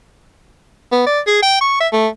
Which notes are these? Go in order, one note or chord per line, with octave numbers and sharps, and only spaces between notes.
B3
D5
G#4
G5
C#6
E5
A3